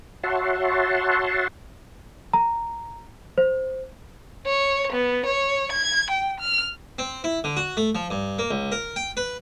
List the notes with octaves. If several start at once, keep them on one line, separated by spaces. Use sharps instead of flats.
F#4 C#5 E5 F#5 A5 C6
A#5
C5
C#5
B3
C#5
G#6
G5
F6
C4
E4
D3
F#4
A3
F3
G2
A#3
C#2
A#4
G5
B4